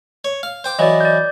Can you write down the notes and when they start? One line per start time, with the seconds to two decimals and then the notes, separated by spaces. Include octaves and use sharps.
0.25 C#5
0.43 F5
0.64 C5 G5 D6
0.79 E3 F#3 D5 D#5
1.00 D5 G6